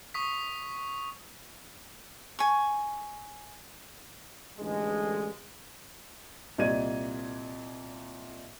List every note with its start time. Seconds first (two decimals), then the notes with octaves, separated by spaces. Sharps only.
0.14 C#6 D#6 B6
2.39 G#5 C#6
4.59 A1 G2 D3 G#3
6.58 C2 A#2 D5 D#5 G#6 D#7